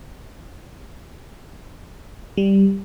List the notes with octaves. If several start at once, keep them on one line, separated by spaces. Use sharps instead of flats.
G3